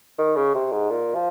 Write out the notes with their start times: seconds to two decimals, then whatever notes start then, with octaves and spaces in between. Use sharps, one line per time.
0.18 D#3
0.36 C#3
0.55 C3
0.72 G#2
0.90 A#2
1.15 F3